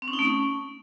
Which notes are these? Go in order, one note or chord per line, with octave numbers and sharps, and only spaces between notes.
C4
C#4
D#4
A3
C#4